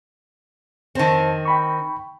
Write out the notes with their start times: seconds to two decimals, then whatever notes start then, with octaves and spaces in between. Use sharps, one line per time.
0.95 F2 D#3 C4 C5 A5
1.45 G5 B5 C#6